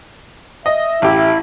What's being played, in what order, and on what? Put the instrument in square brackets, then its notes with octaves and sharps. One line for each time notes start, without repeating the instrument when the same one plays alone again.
[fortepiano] D#5 [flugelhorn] E5
[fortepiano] A1 G4 [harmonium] E4